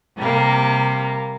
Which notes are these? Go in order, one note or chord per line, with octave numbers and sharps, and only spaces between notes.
C3 G3 A#3